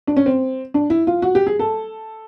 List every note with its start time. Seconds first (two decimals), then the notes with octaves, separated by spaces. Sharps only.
0.07 D4
0.17 C#4
0.26 C4
0.74 D4
0.90 E4
1.07 F4
1.22 F#4
1.35 G4
1.47 G#4
1.59 A4